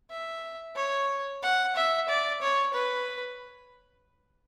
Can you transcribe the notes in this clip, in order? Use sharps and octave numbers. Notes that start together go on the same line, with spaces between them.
E5
C#5
F#5
E5
D5
C#5
B4